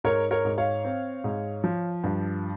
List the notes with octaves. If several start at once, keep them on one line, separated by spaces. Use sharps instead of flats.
G#2 A#4 C#5
A#4 C#5
G#2
C#5 F5
C4
G#2
F3
G2